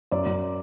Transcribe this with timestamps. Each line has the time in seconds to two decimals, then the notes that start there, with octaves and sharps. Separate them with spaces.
0.11 F#2 D5 D6
0.26 F#2